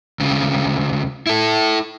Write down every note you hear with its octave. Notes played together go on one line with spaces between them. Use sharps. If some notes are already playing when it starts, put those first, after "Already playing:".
D2 C#3
E4 A4